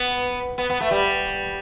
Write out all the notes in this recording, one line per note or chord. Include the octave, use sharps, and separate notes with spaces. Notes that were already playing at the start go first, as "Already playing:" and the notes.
Already playing: B3
B3
B3
A3
G3